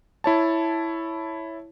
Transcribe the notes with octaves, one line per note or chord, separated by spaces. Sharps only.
E4 C#5 A5